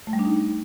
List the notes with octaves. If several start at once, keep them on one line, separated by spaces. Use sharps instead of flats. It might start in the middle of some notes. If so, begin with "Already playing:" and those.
A3
G3
D4
D#4